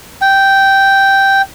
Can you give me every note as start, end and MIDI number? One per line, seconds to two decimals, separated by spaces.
0.21 1.42 79